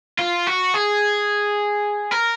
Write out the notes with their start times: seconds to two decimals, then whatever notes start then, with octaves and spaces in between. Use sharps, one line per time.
0.19 F4
0.47 F#4
0.74 G#4
2.12 A#4